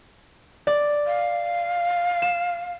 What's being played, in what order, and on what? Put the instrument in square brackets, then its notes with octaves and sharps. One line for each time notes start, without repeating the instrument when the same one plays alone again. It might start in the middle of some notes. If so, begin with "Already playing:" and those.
[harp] D5
[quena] F5
[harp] E7